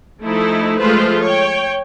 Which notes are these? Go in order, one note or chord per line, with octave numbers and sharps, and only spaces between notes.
F3 A3 D#4 E4
F3 G#3 A3 F4 B4 C5
C#5 G5